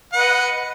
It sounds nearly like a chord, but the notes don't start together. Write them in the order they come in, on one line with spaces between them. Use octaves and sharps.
F#5 B4 D#5